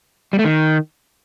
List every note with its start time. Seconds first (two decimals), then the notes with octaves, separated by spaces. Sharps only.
0.33 G3
0.39 A3
0.44 D#3